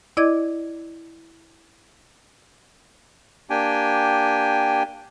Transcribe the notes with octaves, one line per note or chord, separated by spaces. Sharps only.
E4 D5 D#5 D6 G#6
A#3 D4 G4 G5 G#5